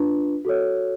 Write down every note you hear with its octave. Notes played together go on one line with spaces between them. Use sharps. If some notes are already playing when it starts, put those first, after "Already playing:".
Already playing: D4 F4 B4
F#4 A4 C#5